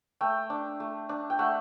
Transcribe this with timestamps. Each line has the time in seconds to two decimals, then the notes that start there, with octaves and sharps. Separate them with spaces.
0.21 A3 G5
0.50 D4
0.80 A3
1.09 D4
1.30 G5
1.39 A3 F#5